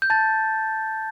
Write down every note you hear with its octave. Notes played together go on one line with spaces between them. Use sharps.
G6
A5 A6